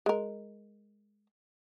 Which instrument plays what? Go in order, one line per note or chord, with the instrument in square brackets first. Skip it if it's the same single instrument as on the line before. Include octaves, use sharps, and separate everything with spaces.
[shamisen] G#3 A#4